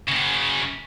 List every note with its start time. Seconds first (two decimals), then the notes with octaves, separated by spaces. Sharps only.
0.09 F#2 C#3